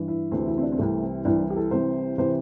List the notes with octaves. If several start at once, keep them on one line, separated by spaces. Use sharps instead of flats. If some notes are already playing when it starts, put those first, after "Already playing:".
Already playing: G2 E3
E4
D2 C3 E3 C4
E4
C4
D4
C4
C2 C3 E3 A3
C4
C2 C3 E3 D4
E4
G4
A4
C2 C3 E3 C5
C3 E3 C5